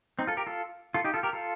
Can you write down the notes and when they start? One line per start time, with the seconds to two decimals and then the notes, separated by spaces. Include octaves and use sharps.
0.19 C4 D#4
0.27 F4 A4
0.37 G4 A#4
0.47 F4 A4
0.94 F4 A4
1.04 D#4 G4
1.14 F4 A4
1.23 G4 A#4
1.33 F4 A4